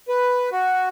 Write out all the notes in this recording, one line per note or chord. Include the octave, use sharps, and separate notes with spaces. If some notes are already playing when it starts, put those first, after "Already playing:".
B4
F#4